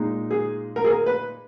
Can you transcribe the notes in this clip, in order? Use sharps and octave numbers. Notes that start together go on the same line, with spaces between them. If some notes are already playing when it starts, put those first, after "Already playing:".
Already playing: A#2 G#3 D#4
G#4
A#4
G#4
A#4
B4